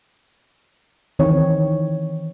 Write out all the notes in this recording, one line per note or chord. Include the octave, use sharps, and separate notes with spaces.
D#3 E3 C4 C#5